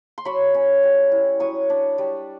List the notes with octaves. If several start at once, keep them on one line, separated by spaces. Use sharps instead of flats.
C6
F#3 B5 C#6
C#4
G3
E4
F#3 C#6 D#6
D4
G3